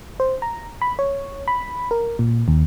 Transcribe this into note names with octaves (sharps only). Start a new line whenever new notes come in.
C5
A#5
B5
C#5
B5
A#4
A#2
D#2